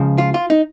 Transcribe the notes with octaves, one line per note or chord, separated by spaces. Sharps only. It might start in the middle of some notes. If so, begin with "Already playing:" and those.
Already playing: C#2 C#3 F3
F4
F4
D#4